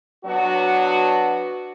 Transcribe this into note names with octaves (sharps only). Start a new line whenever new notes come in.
F#3 B3 D4 F#4